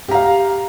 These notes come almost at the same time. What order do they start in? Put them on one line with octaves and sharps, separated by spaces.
G4 A#5 F5